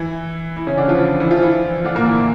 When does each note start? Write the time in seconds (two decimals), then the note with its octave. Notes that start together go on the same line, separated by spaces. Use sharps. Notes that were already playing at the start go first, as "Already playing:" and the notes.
Already playing: E3 E4
0.57 E3 E4
0.67 C#3 C#4
0.77 D3 D4
0.88 F3 F4
1.20 E3 E4
1.31 F3 F4
1.42 E3 E4
1.85 D3 D4
1.95 A#2 A#3
2.06 E3 E4